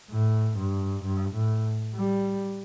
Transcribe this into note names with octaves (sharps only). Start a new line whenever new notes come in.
A2
G2
G2
A2
G3